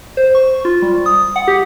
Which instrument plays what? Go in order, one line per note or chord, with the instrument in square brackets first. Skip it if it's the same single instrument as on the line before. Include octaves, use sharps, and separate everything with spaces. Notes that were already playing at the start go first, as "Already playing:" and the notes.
[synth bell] C5
C#6
F4
G3
D#6
F#5
G4